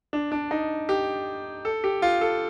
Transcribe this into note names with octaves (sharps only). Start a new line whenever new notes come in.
D4
D4
D#4
G4
A4
G4
F4
A4